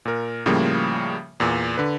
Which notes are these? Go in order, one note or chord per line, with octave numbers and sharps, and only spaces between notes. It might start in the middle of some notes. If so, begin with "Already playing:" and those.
A#2 A#4
A2 C#3 F3 G3 A#3
E2 A#2
D3 B4